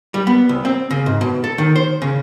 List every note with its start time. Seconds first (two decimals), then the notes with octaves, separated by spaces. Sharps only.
0.14 G3
0.27 B3
0.49 C2
0.65 C4
0.91 C#3
1.06 G#2
1.21 B2
1.44 A4
1.58 D#3
1.76 C5
2.02 C#3